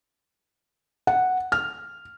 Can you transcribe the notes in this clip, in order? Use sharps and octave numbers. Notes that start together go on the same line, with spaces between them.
F#5
F6